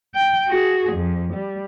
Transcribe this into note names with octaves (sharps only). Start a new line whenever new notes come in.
G5
F#4 G#4
F2
G3